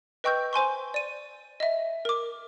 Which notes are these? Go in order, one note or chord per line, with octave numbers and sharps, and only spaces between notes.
B4 D#5 G5 C#6 E6 G6
C5 G#5 C6 C#6
D5 D#7
D#5 E5
A#4 D6